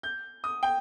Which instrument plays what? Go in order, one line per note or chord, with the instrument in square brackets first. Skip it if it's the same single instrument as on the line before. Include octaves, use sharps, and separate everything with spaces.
[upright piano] G6
D#6
G5